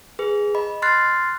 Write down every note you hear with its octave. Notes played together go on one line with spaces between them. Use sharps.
G#4 B4
D#5 B5
C6 F6 F#6 A6 C7